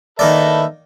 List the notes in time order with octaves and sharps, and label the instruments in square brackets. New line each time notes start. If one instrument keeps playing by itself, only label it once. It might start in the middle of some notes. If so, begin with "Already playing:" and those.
[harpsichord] D#3 A#3 D5 [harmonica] A4 B4 E5